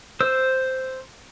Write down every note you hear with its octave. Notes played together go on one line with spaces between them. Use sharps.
C5 E6